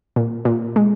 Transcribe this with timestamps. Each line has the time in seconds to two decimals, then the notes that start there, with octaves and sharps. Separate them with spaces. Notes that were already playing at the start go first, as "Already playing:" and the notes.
0.16 A#2
0.45 A#2
0.76 G#3